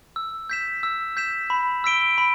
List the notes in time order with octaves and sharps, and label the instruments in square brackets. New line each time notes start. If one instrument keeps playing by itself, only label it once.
[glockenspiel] E6
G6 B6 E7
E6
G6 B6 E7
B5
E6 B6 D7 G7
B5